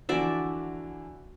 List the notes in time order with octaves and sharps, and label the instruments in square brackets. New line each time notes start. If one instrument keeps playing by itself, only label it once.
[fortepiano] D3 E3 F3 [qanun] F#4 D5 E5